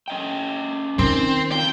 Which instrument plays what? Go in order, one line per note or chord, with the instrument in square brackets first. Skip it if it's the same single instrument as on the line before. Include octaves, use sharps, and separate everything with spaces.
[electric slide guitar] C#4 D#5 G5
[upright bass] D#3 [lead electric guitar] C4
[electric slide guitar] C4 F4 [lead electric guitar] G5